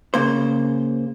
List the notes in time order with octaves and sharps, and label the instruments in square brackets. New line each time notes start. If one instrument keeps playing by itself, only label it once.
[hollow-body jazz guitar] C#3 A#3 C5